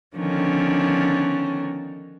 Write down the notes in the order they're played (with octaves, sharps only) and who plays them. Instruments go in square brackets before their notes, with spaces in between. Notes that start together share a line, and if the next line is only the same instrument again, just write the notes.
[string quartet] D3 D#3 F3 B3 C#4 D4